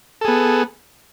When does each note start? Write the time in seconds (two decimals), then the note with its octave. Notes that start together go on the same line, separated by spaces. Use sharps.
0.21 A4
0.25 G#4
0.28 B3